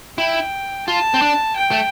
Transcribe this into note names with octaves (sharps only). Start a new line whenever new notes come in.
E4 G5
F4 A5
C4
D4
G5
A3